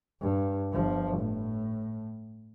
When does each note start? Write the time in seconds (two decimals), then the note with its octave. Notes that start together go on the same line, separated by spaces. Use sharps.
0.21 G2
0.73 G1 F3
1.18 A2